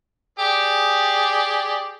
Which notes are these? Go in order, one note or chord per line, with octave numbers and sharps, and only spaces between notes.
G4 G#4 D5